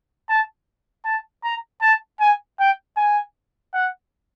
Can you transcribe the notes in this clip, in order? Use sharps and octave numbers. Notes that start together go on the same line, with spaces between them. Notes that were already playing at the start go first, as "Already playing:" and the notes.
A5
A5
A#5
A5
G#5
G5
G#5
F#5